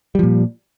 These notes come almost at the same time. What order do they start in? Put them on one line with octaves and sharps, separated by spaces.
G3 F3 A#2